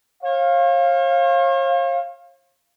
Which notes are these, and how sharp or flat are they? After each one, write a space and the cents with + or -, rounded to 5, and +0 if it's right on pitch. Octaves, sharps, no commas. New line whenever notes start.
C#5 -45 F5 +0